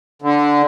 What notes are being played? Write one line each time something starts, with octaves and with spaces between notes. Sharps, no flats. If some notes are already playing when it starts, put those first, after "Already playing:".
D3